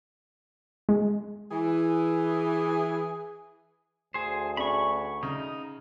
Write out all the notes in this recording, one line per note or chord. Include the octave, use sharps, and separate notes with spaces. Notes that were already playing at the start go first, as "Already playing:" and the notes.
G#3
E3 G#4
D2 G#4 C5
C#4 D4 G#4 B5 C#6
C#3 D#4